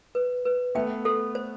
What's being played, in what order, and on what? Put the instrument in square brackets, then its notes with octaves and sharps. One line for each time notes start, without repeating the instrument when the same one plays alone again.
[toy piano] B4
B4
[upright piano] A3 B3 [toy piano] G5
[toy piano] A4
C5